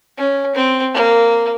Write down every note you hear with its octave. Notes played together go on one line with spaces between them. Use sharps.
C#4
C4
A#3